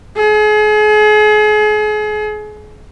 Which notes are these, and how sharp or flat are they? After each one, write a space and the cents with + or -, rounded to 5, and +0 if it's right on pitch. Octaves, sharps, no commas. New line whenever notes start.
G#4 +35